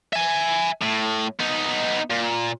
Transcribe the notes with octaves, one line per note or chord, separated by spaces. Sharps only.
E5 G#5
A2
B3 D#4
A#2